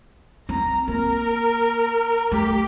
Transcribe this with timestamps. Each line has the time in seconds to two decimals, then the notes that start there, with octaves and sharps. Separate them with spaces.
0.49 C4 A#5
0.88 A#3 A#4
2.32 A3 G4